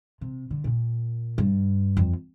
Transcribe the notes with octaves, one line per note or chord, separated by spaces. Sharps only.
C3
D3
A#2
G2
F2